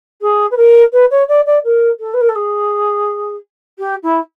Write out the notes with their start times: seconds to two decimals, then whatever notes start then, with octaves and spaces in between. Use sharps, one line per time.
0.21 G#4
0.51 B4
0.57 A#4
0.93 B4
1.11 C#5
1.29 D5
1.46 D5
1.65 A#4
2.00 A4
2.14 B4
2.21 A#4
2.29 A4
2.35 G#4
3.79 G4
4.03 E4